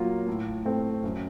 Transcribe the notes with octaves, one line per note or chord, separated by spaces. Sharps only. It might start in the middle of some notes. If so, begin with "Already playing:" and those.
Already playing: A#2 F#3 A#3 F4
A2
A3 C4
F#2